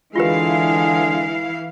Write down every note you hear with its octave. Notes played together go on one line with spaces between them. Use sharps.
D3 E3 G#3 E4 F4 G4 B4 F5